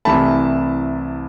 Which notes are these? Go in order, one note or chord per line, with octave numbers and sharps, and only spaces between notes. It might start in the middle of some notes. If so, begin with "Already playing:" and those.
C2 C3 E3 A3 A5 B5